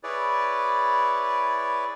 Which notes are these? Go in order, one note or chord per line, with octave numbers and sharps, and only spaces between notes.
E4 G#4 B4 C#5 D5